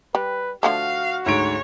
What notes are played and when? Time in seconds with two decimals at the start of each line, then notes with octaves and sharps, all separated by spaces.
0.15 G3 B4
0.63 D3 F3 A3 F#4 F5
1.26 D2 G#2 C#5 D7